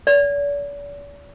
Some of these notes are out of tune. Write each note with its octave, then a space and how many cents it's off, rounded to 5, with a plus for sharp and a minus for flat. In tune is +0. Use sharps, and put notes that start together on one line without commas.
D5 -45